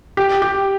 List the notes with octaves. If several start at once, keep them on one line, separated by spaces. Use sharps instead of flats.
G4
G4